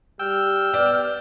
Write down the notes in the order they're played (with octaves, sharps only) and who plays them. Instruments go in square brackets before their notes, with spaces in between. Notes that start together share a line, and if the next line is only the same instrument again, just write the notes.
[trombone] G3 [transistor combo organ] G5 E6 [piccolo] F6
[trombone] B3 [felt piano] D5